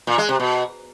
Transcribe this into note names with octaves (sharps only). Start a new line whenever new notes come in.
A#2
G#3
C3
B2